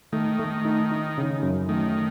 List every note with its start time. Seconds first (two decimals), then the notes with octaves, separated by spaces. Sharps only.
0.13 D#3 A3
0.39 A3
0.65 D#4
0.91 D#4
1.18 C#3
1.43 F#2
1.69 D#3 A3